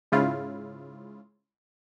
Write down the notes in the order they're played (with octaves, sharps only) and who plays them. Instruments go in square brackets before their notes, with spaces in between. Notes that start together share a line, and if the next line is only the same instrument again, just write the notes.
[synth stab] G#2 C#3 E4 F4